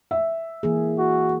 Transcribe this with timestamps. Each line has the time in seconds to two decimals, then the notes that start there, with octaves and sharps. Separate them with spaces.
0.11 E5
0.63 E3 A#3 G#4
0.99 F#4